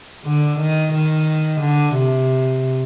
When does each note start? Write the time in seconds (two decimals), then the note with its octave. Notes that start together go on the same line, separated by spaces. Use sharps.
0.25 D3
0.59 D#3
0.93 D#3
1.61 D3
1.96 C3